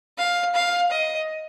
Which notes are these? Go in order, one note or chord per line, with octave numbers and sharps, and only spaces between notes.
F5
F5
D#5